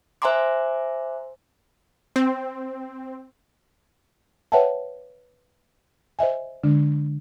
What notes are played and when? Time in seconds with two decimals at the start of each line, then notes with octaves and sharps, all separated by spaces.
0.22 C5 E5 G#5 A#5 C6 D6
2.16 C4
4.52 B4 C#5 E5 F#5 G5 A5
6.19 C5 D#5 E5 G#5
6.64 D3 G#3 D4